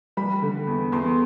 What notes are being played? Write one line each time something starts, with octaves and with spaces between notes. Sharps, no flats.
G3 B5
D3
E2
E2 C6